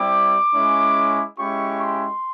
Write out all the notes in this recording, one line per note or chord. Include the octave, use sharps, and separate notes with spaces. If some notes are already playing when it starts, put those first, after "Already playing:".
Already playing: G3 C4 E4 G4 D6
G#3 C#4 E4
G#3 C#4 E4 G4 C#6
C6